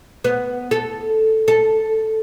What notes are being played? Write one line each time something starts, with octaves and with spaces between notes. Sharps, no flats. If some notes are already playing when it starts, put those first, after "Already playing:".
B3
A4
A4